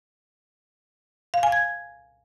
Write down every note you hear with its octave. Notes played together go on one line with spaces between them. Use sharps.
F5
G#5
G#6